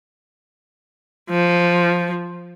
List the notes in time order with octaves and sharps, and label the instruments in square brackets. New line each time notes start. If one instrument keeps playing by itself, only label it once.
[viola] F3